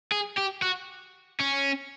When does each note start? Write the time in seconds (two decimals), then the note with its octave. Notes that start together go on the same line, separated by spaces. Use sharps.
0.12 G#4
0.38 G4
0.62 F#4
1.40 C#4